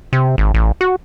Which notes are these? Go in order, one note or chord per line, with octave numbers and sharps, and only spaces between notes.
C3
G#1
A1
F#4